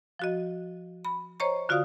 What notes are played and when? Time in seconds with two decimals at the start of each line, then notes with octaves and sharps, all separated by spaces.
0.19 F3 F#4 D#5
1.05 B5
1.40 C5 C#5 D#5 A#5 C#6
1.69 D3 F4 F#4 D5 F5 D#6